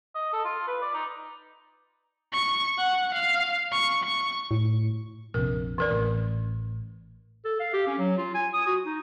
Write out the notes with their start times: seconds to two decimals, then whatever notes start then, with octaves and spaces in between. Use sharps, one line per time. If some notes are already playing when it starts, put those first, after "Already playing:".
0.15 D#5
0.33 A4
0.45 F4
0.67 B4
0.82 D5
0.94 D#4
2.33 C#6
2.78 F#5
3.14 F5
3.72 C#6
4.04 C#6
4.51 A2
5.34 A#1 F2 C3 A#4
5.78 E3 A#4 D5
5.91 A1 A#4
7.45 A4
7.59 F5
7.73 G4
7.87 C#4
7.99 F#3
8.18 F4
8.35 G#5
8.53 D#6
8.66 F#4
8.85 D#4